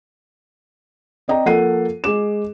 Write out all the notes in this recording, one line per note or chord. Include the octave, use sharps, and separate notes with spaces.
C4 D5 D#5 G5 A#5
F3 A#3 A4 F#5 C7 D#7
G#3 G#4 D6 E7